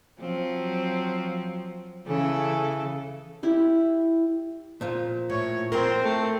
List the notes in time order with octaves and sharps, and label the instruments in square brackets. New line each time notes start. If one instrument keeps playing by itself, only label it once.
[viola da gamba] F3 F#3 C4
C#3 E3 A4
[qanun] E4 G4
[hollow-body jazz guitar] A#2 F3
[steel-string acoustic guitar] A2 [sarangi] C#5
[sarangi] C4 [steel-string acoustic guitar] A#4 C5
[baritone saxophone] A3